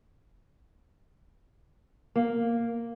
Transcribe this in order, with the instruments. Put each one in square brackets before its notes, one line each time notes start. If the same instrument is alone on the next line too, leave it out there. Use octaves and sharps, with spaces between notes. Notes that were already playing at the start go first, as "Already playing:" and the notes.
[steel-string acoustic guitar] A#3